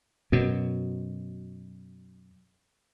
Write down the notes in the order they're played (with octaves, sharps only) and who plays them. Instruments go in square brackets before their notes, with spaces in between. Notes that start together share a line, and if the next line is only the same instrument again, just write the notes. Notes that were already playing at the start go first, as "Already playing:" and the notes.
[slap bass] F#2 B2